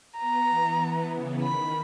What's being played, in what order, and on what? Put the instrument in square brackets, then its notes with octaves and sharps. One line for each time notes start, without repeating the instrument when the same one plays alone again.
[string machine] B3 [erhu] A#5
[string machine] E3
E3
C#3
[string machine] D#3 [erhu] B5